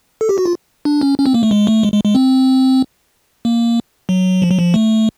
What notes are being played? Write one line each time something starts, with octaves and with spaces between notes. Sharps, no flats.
A4
G4
F#4
F4
D4
C#4
C#4
C4
A#3
A3
G#3
A3
G#3
G#3
G#3
C4
A#3
F#3
F3
F#3
F3
A3